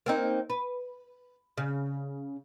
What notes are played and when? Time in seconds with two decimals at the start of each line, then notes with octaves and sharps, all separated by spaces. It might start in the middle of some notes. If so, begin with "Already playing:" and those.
0.06 A#3 C4 D#4
0.50 B4
1.58 C#3